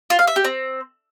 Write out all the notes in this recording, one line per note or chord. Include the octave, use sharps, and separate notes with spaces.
F4
F5
E5
G4
C4